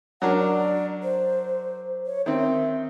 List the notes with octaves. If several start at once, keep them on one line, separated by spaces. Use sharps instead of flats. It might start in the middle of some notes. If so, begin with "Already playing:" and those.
F#3 D4 A#4 F#5
D5
C5
C#5
D#3 C4 E5